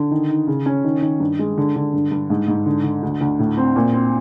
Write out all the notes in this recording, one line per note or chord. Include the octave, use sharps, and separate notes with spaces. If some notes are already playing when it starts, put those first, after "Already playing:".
Already playing: D3
D#3
D#4
C#3
C#4
D#3
D#3
G2
G#3
D3
D3
G2
G2
G#2
G#2
D3
D3
D2
D2
A2
C4
A#2
C4